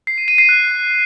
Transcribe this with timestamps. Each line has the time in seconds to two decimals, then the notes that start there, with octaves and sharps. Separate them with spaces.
0.07 C7
0.18 D#7
0.28 D#7
0.38 C7
0.49 F#6